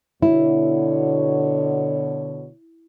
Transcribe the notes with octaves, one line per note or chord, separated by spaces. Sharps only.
B2 D3 E4 C#5